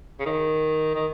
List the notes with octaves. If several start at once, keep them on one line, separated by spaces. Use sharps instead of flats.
C#3
D#3
D#3